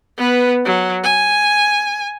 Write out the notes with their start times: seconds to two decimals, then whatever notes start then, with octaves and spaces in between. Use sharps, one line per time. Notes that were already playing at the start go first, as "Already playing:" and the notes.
0.17 B3 B4
0.65 F#3
1.04 G#5